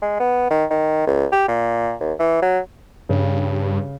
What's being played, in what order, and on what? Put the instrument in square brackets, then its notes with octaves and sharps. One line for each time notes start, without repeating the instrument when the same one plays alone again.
[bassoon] G#3
B3
D#3
D#3
C#2
G4
A#2
D#2
E3
F#3
[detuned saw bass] G2 [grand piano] C#3